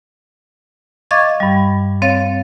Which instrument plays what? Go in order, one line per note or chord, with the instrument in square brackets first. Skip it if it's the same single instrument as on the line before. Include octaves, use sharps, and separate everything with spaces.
[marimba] D#5 F5 C#6 D6 G#6 A6
G2 G3
C4 C#5 F5 A6